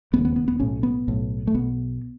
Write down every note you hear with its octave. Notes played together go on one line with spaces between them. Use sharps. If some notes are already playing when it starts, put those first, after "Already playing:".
E1 D#2 C#3 B3
B3
B3
B3
B1 A2 C#4
B3
B1 A2
A3
B1 B2 B3